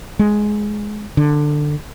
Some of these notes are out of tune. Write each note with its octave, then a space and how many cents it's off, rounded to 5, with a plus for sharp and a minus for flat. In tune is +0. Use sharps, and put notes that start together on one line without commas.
G#3 +10
D3 +15